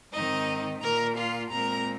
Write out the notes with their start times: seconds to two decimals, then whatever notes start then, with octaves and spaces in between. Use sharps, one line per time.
0.13 G#2 D#3 C4 D#4 D#5
0.82 A#2 A#3 A#4 A#5
1.18 F4 F5
1.52 A#2 G#3 C4 A#4 A#5